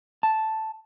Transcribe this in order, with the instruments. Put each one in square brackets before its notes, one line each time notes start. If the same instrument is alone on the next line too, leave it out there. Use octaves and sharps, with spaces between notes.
[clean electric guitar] A5